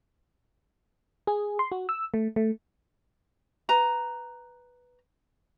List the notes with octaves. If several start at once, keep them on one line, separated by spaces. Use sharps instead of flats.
G#4
C6
F#4
E6
A3
A3
B4 A#5